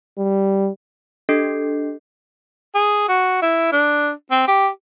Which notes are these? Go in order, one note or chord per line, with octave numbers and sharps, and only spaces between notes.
G3
D4 G4 A4 D#5 G6 C7
G#4
F#4
E4
D4
C4
G4